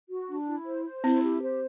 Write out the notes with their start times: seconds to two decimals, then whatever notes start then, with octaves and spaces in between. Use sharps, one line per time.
0.09 F#4
0.29 D4
0.47 E4
0.66 C5
0.85 C5
1.04 C4 E4
1.23 G4
1.41 C5